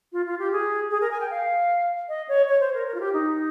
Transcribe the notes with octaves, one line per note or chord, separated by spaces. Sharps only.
F4
F4
G4
G#4
G#4
A#4
G#5
G5
F5
D#5
C#5
C#5
C5
A#4
A#4
F4
G4
D#4